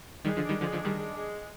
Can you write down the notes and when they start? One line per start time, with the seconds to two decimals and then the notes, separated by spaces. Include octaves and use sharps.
0.25 D#3 G3 G#3
0.37 D3 F3
0.43 D4
0.49 D#3 G3
0.61 D3 F3 G#3
0.72 D3 F3
0.79 D4
0.85 D#3 G3
0.97 G#3
1.15 G#3